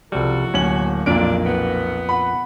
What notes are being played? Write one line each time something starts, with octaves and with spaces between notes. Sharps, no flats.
F#1 C2 F3 G3 F#4 A4
D1 A#3 C#4 F#7
B1 F2 A#2 D4 D7
B3
F#5 B5